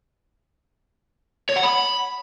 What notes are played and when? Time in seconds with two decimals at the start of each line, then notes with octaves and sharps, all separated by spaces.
1.49 C#5
1.56 F#5
1.63 B5